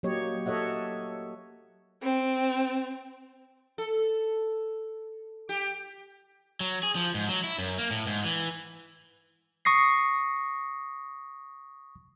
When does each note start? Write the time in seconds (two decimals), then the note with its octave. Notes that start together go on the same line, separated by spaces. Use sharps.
0.03 F#3 A#3 G4 C#5 D#5
0.46 A4 C#5 D#5 E5 F#5
2.02 C4
3.78 A4
5.49 G4
6.60 F#3
6.83 G#4
6.95 F3
7.14 G#2
7.29 F#3
7.44 E4
7.59 F#2
7.78 A#3
7.91 A2
8.07 G#2
8.24 E3
9.65 C#6 D#6 A#6 C7